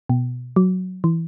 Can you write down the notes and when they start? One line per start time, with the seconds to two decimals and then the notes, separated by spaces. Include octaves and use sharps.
0.09 B2
0.56 F#3
1.04 E3